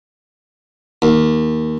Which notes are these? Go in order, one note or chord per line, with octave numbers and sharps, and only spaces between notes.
D#2